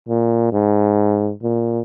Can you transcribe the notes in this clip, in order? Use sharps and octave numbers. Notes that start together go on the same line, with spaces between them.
A#2
G#2
A#2